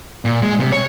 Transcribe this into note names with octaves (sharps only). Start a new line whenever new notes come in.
A#2
G#3
C3
C#5